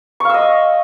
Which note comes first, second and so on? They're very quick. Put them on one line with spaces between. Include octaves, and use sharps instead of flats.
C#6 F5 E6 D#5